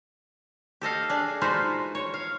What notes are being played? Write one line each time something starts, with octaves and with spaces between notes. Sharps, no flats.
G4 A4 D#5 F5
D4 G#4
G#3 D#4 F4 F#4 B4 C5
C#5
F5